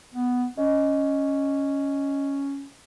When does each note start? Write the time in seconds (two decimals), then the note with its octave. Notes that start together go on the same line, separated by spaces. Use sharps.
0.14 B3
0.57 C#4 D#5